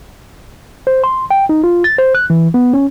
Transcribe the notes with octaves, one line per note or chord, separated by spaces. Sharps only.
C5
C6
G5
D#4
F4
A6
C5
F#6
E3
B3
C#4